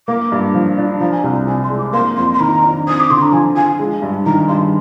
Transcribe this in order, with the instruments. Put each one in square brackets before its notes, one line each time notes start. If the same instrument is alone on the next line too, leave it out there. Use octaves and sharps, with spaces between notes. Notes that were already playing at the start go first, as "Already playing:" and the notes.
[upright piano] A#3 [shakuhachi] D6
[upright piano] G2
F3
D4
[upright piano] F3 [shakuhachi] A#5
[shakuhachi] G#5
[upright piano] C2 [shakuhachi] A#5
[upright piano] C3 [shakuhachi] G#5
[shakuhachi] C6
[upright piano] G#3
[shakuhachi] D6
[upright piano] A#3 [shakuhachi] C6
[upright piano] F2 [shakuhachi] C6
[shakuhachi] C6
[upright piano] D#3 [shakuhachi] A#5
[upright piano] D4
[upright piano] C4 [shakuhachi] D#6
[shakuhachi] D6
[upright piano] D3 [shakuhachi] C6
[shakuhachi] A#5
[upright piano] F3 [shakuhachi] G#5
[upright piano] F4 [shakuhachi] G#5
[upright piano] G#3
G2
[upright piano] D#3 [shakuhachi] A#5
[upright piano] G2 [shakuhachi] C6